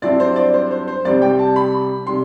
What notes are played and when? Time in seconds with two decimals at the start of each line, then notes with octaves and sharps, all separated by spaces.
0.02 G2 F#3 C4 E4 D5
0.20 C5
0.36 D5
0.54 C5
0.71 C5
0.88 C5
1.05 C2 C3 G3 D5
1.22 G5
1.39 A5
1.56 B5
2.07 C3 G3 C6